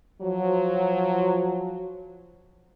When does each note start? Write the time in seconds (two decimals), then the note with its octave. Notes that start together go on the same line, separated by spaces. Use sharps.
0.22 F3 F#3